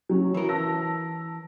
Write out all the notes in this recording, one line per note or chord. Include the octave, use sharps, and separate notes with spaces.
F#3 C#4
E3 A#4
A5 E6 A#6